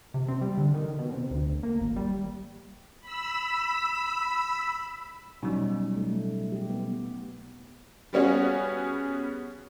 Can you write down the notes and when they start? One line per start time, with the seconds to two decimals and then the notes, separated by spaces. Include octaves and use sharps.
0.14 C3
0.28 C4
0.41 G3
0.58 D3
0.74 D#3
0.99 B2
1.12 C3
1.31 D2
1.63 A#3
1.80 G#1
1.96 G3
3.01 B5 E6
5.43 B2 F#3 G3 C#4 D#4
5.96 A3
6.52 G4
6.70 B3
8.13 G3 B3 C#4 F#4 G#4